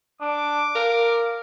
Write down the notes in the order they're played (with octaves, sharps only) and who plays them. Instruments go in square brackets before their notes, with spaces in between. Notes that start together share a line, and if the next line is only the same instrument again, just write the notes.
[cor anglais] D4 [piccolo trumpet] D6
[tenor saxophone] A#4 [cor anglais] F5